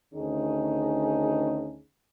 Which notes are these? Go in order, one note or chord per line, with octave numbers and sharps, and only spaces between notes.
D2 D#3 C#4 D#4 G#4